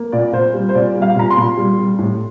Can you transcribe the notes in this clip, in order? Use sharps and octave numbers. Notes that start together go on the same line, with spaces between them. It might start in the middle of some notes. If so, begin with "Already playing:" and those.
Already playing: A#3
A#2 D5
A#2 C5
G3
C5
A#2 D5
G3
F5
A#2 A#5
C6
A#2
G3
G3
A2